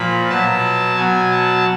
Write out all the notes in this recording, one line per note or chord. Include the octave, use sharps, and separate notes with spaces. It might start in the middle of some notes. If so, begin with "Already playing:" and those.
Already playing: A#2 F3 B5
B2 F#3 A5
B2 F#3 G#5
A5